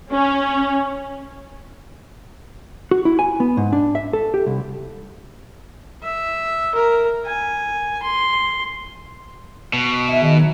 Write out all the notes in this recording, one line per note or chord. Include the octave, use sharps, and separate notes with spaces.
C#4
F#4
E4
G#5
B3
G#2
D4
E5
A4
G4
C2
E5
A#4
G#5
C6
B2
D#3 E4
D#3 G#4 D#5
F#3